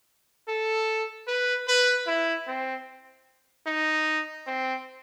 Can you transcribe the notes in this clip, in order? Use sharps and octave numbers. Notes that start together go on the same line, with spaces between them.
A4
B4
B4
E4
C4
D#4
C4